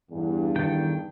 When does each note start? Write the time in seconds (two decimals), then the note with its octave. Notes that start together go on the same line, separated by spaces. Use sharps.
0.11 E2 G2
0.56 E2 D#3 A4 G5